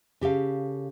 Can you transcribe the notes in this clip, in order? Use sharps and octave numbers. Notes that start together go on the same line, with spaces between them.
C#3 G4 A4 F5